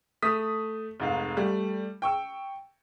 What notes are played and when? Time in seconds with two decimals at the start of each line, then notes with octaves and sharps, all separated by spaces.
0.22 A3 D#6 B6
1.00 F1 G#2 F5
1.37 G3 A3
2.02 G5 C#6 E6